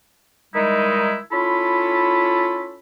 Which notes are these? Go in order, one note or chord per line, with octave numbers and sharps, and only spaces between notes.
D#3 G3 G#3 D#4 E4
C#4 E4 F4 A4 B5